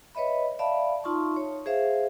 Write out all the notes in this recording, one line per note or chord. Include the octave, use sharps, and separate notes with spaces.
B4 C#5 D#5 E5 B5
D5 E5 F5 A5 B5
D#4 F4 A5 C6 C#6
C#5
G#4 C5 E5 F5